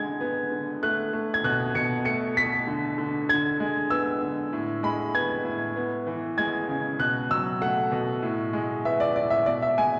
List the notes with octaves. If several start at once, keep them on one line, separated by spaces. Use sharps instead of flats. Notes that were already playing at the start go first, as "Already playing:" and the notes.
Already playing: D3 G#3 G#6
B3
D3
A3 F#6
A3
G#6
B2 F#6
B2 C#7
A3 C#7
A3 B6
D3
D3
D3 G#6
G#3
B3 E6
D3
A2
G#3 B5
B3 G#6
A2
B3
E3
G#3 G#6
C#3
B2 F#6
F#3 E6
A3 F#5
B2
A2
G#3
B3 E5
D5
A2 D5
E5
B2 D5
E5
G#3 G#5